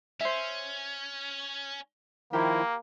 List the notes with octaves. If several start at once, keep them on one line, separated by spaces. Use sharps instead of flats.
C#4 C5 E5
D#3 F3 A#3 E4 G4 A#4